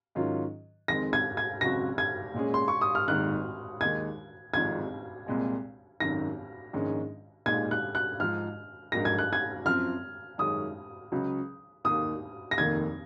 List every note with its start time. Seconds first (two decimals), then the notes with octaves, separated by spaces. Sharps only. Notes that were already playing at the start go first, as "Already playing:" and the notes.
0.15 G#2 D#3 F#3 C#4 F4
0.88 F2 D#3 G#3 C4 A#6
1.13 G#6
1.37 G#6
1.61 C#2 C#3 F#3 C4 F#4 A#6
1.98 G#6
2.34 A#2 G#3 C#4 G#4
2.54 C6
2.68 C#6
2.81 D#6
2.95 F6
3.08 G#1 G#2 D#3 A#3 F#6
3.81 D#2 D#3 G#3 D#4 G#6
4.54 G#1 G#2 F3 C4 G#6
5.27 C2 A#2 G#3 C4
6.00 G#1 F#2 D#3 A#6
6.73 A#1 G#2 D#3 G#3 C#4
7.46 A#2 G#3 D#4 G#6
7.71 F#6
7.95 F#6
8.20 G#2 F3 G#3 F6
8.92 A#1 G#2 F#3 A#3 A#6
9.05 G#6
9.18 F#6
9.33 G#6
9.66 F#2 F3 C4 F6
10.38 F#2 D#3 G#3 C#4 D#6
11.12 C#2 C#3 F#3 C#4
11.85 D#2 D#3 A#3 D#6
12.51 A#6
12.58 F1 D#2 D#3 A#3 G#6